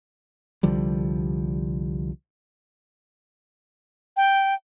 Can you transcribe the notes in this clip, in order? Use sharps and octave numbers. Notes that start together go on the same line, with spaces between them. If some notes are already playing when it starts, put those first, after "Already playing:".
C2 D3 F3 G3
G5